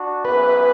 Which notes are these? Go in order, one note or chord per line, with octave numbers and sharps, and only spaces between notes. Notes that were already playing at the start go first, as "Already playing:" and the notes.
Already playing: D4 F#4
G#1 F#2 E3 B3 B4